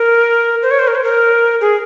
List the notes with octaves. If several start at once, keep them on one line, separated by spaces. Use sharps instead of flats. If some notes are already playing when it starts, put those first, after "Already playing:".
Already playing: A#4
C5
C#5
C5
A#4
C5
A#4
G#4